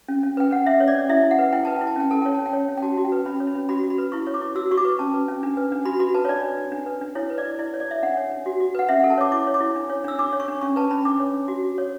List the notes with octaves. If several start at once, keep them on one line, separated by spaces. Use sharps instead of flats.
C#4
C#4
B4 G5
C#4 F#5
C#4 E5
C#5
D5
C#4
E4 E5
E4
F#5
B4
E4 G5
B4 A5
E4 G5
A5
C#4 G5
A4 A5
C#5 G5
C#4 A5
G5
C#5
C#4
G5
F#4 A5
F#4
G5
B4
C#4 B5
C#5
B5
C#4
F#4 B5
F#4
B5
B4
E4 C#6
C#5
D6
E4
F#4 E6
F#4 C#6
D6
B4
C#4 A5
B4
C#4
D4
B4
D4
F#4 B5
F#4 B5
B4 A5
C#5
D4 D5
B4
D4
D4
B4
D4
E4 C#5
B4
D5
E4
E4 D5
C#5
D5
E4 E5
D4 F#5
C#5
D4
F#4
F#4
B4 F#5
C#4 E5
A4 F#5
A5
C#5 D6
E4 D6
C#5
D6
E4
D4
C#5
D4 E6
D4 D6
C#5
C#6
D4
C#4 C#6
B4 A5
C#4 B5
D4 D6
C#5
D4
F#4
F#4
C#5